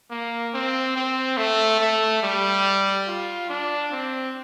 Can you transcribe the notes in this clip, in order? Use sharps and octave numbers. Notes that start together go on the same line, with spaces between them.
A#3
C4
C4
A3
A3
G3
F4
D4
C4